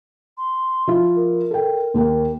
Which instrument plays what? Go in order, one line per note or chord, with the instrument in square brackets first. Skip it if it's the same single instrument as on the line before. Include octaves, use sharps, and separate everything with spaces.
[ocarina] C6
[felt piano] F3 E4 F4
[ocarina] A#4
[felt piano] A4 G5
D#2 A#3 G5